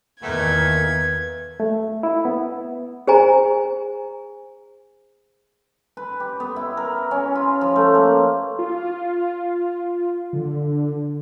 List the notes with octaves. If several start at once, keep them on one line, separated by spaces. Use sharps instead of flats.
E2 A#2 D#3 A3 B3 G#6
A3
E4
B3
G#4 C5 D#5 G#5 A#5
B4
G4
B3
E4
A#4
C#4
F4
F3
A3
A#3
F4
D3